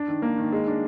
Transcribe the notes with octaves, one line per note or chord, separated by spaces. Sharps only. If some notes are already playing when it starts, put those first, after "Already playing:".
Already playing: D4
D#3
A#3
D#3
G#3
D4